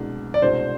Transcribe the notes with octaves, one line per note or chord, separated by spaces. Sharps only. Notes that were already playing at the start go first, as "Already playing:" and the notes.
Already playing: C2 B2 G#3 D4
D5
C2 B2 G#3 D4 C5